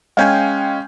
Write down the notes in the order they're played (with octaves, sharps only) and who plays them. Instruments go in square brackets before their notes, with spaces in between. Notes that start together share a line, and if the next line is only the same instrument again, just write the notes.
[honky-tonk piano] G#3 C#4 [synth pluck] F5 G5 G#5